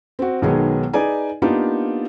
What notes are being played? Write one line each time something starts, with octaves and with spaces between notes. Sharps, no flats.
C4 F#4
B1 D#3 F#3 G#3 B3 G#4
D#4 G#4 B4 D5 G#5
A#3 B3 D4 D#4 F4 G4